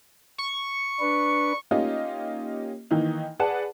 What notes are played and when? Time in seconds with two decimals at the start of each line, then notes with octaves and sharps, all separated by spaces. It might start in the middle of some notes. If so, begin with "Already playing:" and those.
0.38 C#6
1.00 D4 B4
1.71 A#3 C#4 D#4 F4 G4 D#5
2.91 D#3 E3 A#3 D#4
3.39 G#4 B4 D5 F#5 A5